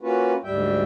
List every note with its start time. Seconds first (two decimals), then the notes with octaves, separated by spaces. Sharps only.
0.01 A#3 C#4 F4 F#4 B4
0.44 D2 G#2 G3 E5 G5